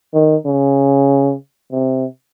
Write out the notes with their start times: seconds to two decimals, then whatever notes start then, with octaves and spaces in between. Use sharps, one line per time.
0.14 D#3
0.46 C#3
1.72 C3